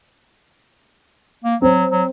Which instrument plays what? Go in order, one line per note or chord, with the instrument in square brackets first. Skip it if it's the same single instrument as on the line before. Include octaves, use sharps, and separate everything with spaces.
[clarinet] A#3
[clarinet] F#3 [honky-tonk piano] C4
[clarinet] F#3